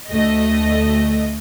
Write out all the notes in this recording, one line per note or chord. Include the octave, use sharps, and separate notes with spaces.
D2 A3 D#5